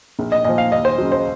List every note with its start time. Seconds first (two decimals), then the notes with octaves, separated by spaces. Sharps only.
0.19 A#1
0.32 D#5
0.45 A#2 F3 D#5
0.58 F5
0.71 D#2 D#5
0.85 C5
0.98 C#3 F#3
1.12 C5